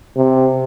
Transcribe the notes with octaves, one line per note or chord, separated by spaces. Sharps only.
C3